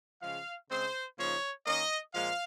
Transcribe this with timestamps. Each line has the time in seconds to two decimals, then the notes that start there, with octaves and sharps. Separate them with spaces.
0.22 C#3 F3 G#3 F5
0.70 C#3 G#3 C4 C5
1.18 C#3 F3 A#3 D#4 C#5
1.66 D#3 A#3 C#4 D#5
2.14 A#2 F3 G#3 F5